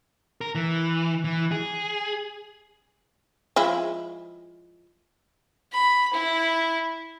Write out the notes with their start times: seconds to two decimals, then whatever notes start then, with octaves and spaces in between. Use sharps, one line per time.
0.41 A#4
0.55 E3
1.24 E3
1.52 G#4
3.56 F3 G#3 E4
5.73 B5
6.13 E4